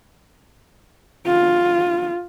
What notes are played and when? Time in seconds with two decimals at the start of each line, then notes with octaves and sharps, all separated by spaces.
1.26 F4